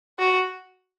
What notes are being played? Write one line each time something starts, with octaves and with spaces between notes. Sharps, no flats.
F#4